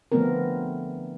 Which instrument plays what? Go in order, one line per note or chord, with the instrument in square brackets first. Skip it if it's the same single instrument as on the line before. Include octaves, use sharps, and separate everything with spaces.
[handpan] D3 F3 A3 B3 C4 A#4